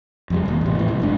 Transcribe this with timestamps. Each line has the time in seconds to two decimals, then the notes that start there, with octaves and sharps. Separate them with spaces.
0.30 F2 C#3 G3
0.45 E1 D#2
0.61 A1 C3
0.75 A2 E3
0.88 C2
1.00 F#1 G#2 D4